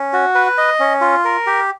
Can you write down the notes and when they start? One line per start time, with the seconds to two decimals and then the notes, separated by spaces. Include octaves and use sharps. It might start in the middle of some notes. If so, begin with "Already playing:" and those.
Already playing: C#4
0.13 F#4
0.35 B4
0.58 D#5
0.80 C#4
1.01 F4
1.25 A#4
1.47 G4